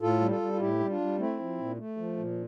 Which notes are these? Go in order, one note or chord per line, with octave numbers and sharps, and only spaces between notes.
A2 F4 A4
G3
F4 A4
G3
F4
A2 E4 G4
G3
D4 F4
G3
A3 C4 E4
F3
A#2
A3
F3
A#2